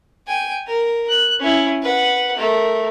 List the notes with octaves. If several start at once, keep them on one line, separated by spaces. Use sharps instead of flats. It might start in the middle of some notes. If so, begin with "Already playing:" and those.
G5 G#5
A#4
F#6
C#4 E4
B4 F#5
A3 A#4